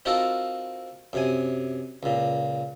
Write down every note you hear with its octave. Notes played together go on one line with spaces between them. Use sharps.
C4 D#4 F4 F#4 A4 A#4
F#2 C3 G#5
C#2 A#2